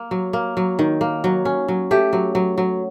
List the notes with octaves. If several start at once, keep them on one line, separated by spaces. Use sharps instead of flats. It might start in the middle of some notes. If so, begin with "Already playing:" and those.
Already playing: A#3
F#3
A#3
F#3
D#3
A#3
F#3
C#4
F#3
A3 G4
F#3
F#3
F#3